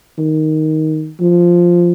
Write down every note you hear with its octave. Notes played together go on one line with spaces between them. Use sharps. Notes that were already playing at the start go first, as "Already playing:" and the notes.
D#3
F3